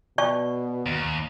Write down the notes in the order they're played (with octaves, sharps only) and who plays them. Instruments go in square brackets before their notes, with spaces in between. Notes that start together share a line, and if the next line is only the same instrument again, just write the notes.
[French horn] B2 [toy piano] D5 A5 C#6
[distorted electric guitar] D#2